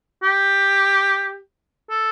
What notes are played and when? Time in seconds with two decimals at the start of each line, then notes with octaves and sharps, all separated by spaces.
0.23 G4
1.90 A4